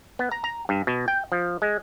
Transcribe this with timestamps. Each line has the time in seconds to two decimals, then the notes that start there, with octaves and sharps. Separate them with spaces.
0.19 B3
0.31 A#5
0.44 A#5
0.69 G2
0.87 B2
1.08 G5
1.32 F3
1.62 G#3